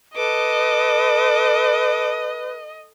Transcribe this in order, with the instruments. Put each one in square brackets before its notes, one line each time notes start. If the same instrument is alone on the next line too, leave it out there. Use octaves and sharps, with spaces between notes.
[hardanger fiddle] A4 D6 [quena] B4 [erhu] D#5